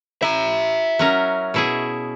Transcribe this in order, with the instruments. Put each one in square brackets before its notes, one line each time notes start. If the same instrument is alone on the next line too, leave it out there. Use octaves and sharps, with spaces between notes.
[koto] E4 [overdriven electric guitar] E5 A#5
[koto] F#3 C#4 A#4
B2 E4 G#4